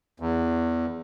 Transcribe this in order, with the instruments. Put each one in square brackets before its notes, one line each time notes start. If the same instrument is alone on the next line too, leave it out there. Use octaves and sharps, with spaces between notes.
[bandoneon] E2